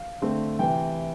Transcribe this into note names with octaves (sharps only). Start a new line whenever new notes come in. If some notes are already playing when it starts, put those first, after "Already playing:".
Already playing: F5
D3 A3 C4
C3 E3 G5